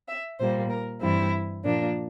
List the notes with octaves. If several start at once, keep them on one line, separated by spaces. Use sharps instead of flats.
E5
A#2 G3 A#3 C5
A#4
G2 E3 G3 C4 E4
A#2 F3 A#3 D4